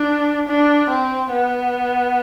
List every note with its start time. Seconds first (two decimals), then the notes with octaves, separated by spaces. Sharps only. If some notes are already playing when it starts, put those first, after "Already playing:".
Already playing: D4
0.47 D4
0.90 C4
1.32 B3